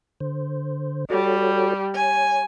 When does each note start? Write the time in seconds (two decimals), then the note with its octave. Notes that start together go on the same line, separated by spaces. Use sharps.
0.20 D3 C5
1.10 G3 F#4 A4 C#5
1.95 C#5 G#5